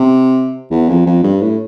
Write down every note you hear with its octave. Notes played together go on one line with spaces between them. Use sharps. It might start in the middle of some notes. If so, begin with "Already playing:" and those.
Already playing: C3
E2
F2
F2
G2
A2